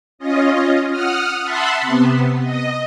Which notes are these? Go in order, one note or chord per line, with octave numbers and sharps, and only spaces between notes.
C#4 F4 D#5
F#5 D#6 F6
E5 F#5 A5 B5 C6
C3 B3
D#5